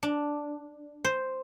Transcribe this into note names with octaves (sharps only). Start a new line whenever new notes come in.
D4
C5